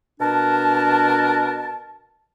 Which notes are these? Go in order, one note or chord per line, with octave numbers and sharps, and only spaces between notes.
B2 D4 A#4 A5